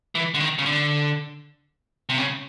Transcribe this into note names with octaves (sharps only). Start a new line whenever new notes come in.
E3
D3
D#3
C#3
D3
C3
C#3